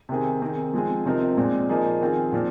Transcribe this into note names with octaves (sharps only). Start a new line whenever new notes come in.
C3 D#3 C4 G#4
D#3 C4 G#4
F3 G#3 C4 G#4
C3 F3 C4 D#4 A#4
A#2 G#3 C4
F3 A#3 D#4 G#4
D#3 C4 F4 G#4
A#2 F3 C4